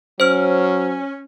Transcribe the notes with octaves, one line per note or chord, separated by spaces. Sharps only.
F#3 C#4 C5 F6